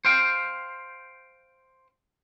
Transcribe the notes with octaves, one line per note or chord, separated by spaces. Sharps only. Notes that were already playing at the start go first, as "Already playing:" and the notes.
C5 F5 G5